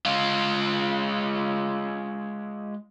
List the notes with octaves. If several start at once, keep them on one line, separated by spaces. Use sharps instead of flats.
G#3 F4